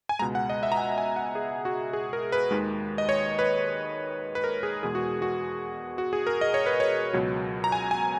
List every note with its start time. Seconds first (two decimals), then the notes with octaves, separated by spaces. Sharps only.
0.09 G#5
0.19 C#2 B2 G#3 A#5
0.35 F#5
0.50 D#5
0.63 E5
0.72 A#5
0.77 G#5
0.98 G#5
1.16 F#5
1.35 G#4
1.65 F#4
1.93 G#4
2.13 A#4
2.32 B4
2.51 D#2 D#3 G#3
2.98 D#5
3.09 C#5
3.39 B4
4.35 B4
4.44 A#4
4.63 G#4
4.83 E2 B2 G#3 G#4
4.95 F#4
5.22 F#4
5.98 F#4
6.13 G#4
6.27 A#4
6.41 D#5
6.54 C#5
6.66 B4
6.80 C#5
7.13 C#2 B2 F#3
7.64 A#5
7.72 G#5
7.91 G#5